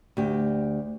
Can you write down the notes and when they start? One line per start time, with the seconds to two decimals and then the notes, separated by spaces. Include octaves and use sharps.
0.17 D2 G4